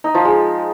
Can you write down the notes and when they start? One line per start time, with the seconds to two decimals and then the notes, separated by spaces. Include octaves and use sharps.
0.04 D#4
0.15 F3
0.25 G#3